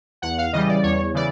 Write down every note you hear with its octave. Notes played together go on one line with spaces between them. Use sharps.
E2 F#5
F5
C#3 E3 G3 D#5
D5
E2 C#5
C#3 E3 D5